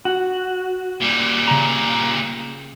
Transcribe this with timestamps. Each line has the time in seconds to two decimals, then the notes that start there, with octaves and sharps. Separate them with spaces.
0.05 F#4
1.00 A#2 G3
1.48 C#3 A#5